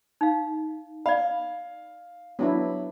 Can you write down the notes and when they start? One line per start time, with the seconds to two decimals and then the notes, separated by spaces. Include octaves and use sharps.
0.21 D#4 F5
1.06 D5 F5 B5
2.39 F#3 B3 D4 E4